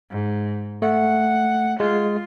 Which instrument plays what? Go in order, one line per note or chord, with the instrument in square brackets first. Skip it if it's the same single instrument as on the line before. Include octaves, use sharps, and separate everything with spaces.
[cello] G#2
[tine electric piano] A3 [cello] F#5
[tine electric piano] G#3 [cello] F4